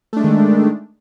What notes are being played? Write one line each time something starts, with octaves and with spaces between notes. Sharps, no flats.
D#3 G#3 A3 D4